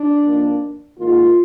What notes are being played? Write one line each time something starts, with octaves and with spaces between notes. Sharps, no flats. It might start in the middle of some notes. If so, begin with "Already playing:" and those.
Already playing: D4
F2 D#3 A#3
G#2 D#3 A#3 F4